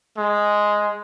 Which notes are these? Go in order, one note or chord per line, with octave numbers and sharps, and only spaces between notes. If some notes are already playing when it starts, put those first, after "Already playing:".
G#3